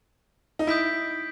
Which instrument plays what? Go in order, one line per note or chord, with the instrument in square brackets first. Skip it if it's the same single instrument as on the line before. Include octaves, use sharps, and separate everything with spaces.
[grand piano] D#4
[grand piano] E4 [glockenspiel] D#6 G6 B6 D7